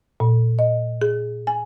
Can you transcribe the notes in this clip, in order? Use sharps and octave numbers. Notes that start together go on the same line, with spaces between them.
A#2
D#5
G#4
G#5